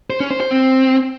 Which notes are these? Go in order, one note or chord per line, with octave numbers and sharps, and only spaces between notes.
C5
C#4
C5
C5
C4